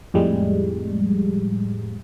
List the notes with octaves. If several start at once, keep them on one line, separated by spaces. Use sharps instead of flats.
F2 A2 G3 G#3